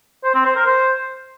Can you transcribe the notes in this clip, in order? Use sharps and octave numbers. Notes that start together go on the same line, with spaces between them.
C5
C4
C5
A#4
C5